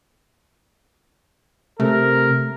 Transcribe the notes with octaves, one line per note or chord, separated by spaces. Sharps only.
C3 A3 A#4